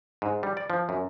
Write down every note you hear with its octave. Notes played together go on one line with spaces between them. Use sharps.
G#2
G3
D5
F3
F#2